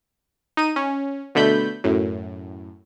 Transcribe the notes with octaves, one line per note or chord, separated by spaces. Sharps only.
D#4 D#7
C#4
B2 D3 A3 B5 G6
F#2 A2